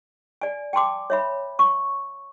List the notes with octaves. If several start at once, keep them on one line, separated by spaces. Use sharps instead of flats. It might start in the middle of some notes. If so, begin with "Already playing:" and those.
D5 G#5
G5 A5 C6 D6
C#5 E5 B5
C#6